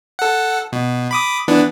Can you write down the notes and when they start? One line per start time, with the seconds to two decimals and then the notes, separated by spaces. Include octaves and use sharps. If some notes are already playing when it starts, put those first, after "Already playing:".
0.19 A4 F#5
0.73 B2
1.11 B5 D6 D#6
1.48 E3 B3 D4